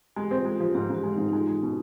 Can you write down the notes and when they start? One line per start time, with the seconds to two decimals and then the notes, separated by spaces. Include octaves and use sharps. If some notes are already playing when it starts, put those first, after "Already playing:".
0.16 G#3 G4
0.31 C4 F4
0.45 G#3 F4
0.55 F3 G4
0.75 G#2 G#4
0.90 G#2 G4
1.04 G#3
1.13 G#2 D#4
1.29 D#4
1.32 G#3 F4
1.47 G#3
1.62 B2